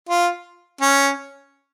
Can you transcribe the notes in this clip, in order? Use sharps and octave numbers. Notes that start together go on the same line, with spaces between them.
F4
C#4